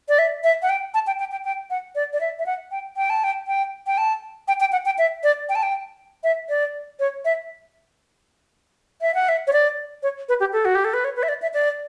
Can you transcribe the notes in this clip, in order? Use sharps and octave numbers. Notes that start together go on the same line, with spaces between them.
D5
E5
E5
F#5
G5
A5
G5
G5
G5
G5
F#5
D5
D5
E5
E5
F#5
G5
G5
A5
G5
G5
G5
A5
G5
G5
F#5
G5
E5
D5
G5
A5
G5
E5
D5
C#5
E5
E5
F#5
E5
C#5
D5
C#5
B4
G4
A4
F#4
G4
A4
B4
C#5
B4
E5
D5
E5
D5